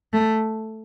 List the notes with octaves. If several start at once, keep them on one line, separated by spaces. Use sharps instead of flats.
A3